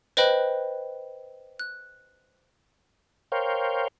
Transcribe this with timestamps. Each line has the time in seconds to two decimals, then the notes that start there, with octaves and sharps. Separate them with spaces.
0.17 B4 C5 D#5 G5 B5 F#6
1.59 F#6
3.32 A#4 C5 C#5 F5 G5